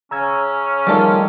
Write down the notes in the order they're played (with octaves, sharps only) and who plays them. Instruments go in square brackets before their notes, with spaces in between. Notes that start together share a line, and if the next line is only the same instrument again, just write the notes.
[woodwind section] C#3 C#4 [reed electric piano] A#5 E6 G#6
[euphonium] D#3 [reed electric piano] F3 G3 A3 [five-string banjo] F4 A4 D5